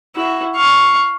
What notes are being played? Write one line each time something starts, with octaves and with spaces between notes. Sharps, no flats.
E4 F#4
F5 C#6